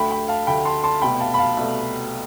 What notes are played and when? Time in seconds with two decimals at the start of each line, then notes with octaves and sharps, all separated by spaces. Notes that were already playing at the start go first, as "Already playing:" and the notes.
Already playing: D2 D3 A3 G5 B5
0.10 G5 B5
0.28 F5 A5
0.47 D2 D3 A3 G5 B5
0.65 A5 C6
0.84 A5 C6
1.01 C2 B2 A3 G5 B5
1.20 F5 A5
1.34 B5
1.38 F5 A5
1.57 C2 B2 A3